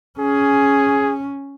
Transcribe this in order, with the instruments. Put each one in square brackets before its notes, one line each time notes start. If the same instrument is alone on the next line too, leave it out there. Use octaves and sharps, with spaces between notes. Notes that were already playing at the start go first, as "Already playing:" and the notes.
[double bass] C#4 [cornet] G#4